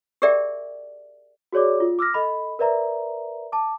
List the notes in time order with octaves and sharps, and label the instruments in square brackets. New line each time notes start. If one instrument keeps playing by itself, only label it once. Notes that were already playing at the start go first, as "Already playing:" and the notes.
[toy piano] G4 G#4 A#4 D5 E5 G5
[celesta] F#4 G#4 C#5 D5 D6
F4
D6 E6 F6 A#6
A4 D#5 B5
A#4 B4 D5 E5 A#5
A5 D6